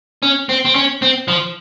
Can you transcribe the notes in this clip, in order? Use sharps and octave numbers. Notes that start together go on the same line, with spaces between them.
C#4
C4
C4
C#4
C4
F3